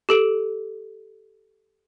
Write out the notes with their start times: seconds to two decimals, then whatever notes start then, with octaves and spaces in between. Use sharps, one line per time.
0.09 G4 A4 D7